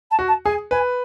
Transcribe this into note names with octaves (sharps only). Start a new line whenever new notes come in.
A5
F#4
A5
G#4 G#5
B4 G#5